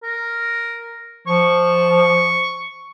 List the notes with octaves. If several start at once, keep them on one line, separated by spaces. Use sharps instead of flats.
A#4
F3 C#6